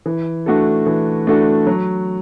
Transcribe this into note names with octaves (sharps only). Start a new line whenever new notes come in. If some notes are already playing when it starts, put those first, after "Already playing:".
E3
A3 D4 F#4 A4
E3
A3 D4 F#4 A4
F#3